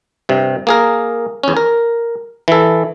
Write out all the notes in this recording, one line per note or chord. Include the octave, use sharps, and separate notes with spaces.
G2 C3
A#3 G#4 A#4
E2 C#4
A#4
E3 A4